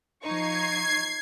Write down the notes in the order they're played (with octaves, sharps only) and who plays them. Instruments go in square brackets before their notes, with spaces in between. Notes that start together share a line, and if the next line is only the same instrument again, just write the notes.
[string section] F3 D#4 C#6 [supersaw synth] G#6 C7